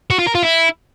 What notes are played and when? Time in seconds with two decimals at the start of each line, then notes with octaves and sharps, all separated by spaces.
0.11 F#4
0.19 F4
0.27 A#4
0.35 F4
0.43 E4